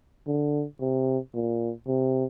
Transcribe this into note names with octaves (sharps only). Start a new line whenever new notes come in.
D3
C3
A#2
C3